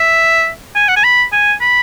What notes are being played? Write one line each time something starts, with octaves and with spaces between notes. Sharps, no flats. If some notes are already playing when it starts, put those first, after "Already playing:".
Already playing: E5
G#5
F#5
G#5
B5
G#5
B5